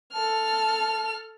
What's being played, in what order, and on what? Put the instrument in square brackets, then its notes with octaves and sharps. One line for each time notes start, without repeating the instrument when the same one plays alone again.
[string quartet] A4 F6 [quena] A5